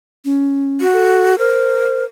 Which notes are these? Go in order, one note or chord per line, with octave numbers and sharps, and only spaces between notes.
C#4
F#4
A4
A#4 C5